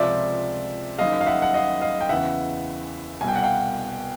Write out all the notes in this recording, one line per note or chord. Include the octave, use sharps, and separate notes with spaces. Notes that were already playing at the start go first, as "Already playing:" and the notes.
Already playing: C#2 C3 F3 D5 E5
F#1 F#2 D#3 D#5 F5
F5
E5 F#5
F#5
D#5 F5
D#5 F5
G5
E2 C#3 E3 E5 F#5
C2 B2 G5 G#5
F#5
F5 G5